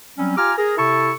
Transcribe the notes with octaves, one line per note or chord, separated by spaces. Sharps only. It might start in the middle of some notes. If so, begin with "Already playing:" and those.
F#3 G3 C4 C#4
F4 G4 G#5 A#5 D6 F6
G#4 A#4
C3 E4 A4 A5 C#6